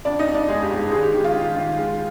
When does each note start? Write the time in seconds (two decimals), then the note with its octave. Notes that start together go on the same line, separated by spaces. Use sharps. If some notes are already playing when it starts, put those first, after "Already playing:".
0.05 F2 D4 D5
0.19 D#4 D#5
0.27 F2
0.34 D4 D5
0.48 G1 G#3 G#4
0.62 G4
0.70 G1
0.77 G4
0.91 D#3 G#3 G#4
1.03 G4
1.13 D#3 G4
1.24 F4
1.34 D#3
1.56 D#3
1.78 G#3